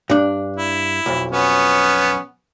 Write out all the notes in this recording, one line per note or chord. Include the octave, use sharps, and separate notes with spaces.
G2 D4
E4
B1 F2
B3 C#4